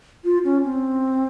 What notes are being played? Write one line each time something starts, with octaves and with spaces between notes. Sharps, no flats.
F4
C#4
C4